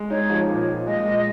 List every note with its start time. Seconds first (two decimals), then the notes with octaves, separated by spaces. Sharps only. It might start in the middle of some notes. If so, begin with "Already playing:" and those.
Already playing: G#3
0.10 D#4 C#5
0.30 F3
0.49 A#2
0.68 A#2
0.87 G#3 D#5
1.06 A#2